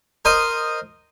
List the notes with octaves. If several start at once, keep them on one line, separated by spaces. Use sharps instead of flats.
A#4 C5 D#5 D#6